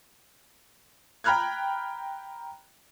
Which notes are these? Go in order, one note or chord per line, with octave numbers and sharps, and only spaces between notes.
G5 A#5 B5 F6 F#6 G#6